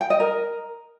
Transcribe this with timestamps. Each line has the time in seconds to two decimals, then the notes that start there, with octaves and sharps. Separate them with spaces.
0.01 G5
0.10 D#5
0.20 A#4